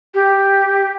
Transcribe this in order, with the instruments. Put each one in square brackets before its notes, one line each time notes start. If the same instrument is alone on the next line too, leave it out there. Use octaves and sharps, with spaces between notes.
[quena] G4